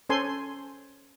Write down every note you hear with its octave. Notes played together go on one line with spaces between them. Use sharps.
C#4 A4 C5 G#5 C6